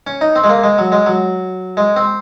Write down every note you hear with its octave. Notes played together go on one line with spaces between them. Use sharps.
C#4
D#4
C4
G#3
A#3
G#3
F#3
G#3
F#3
G#3
C4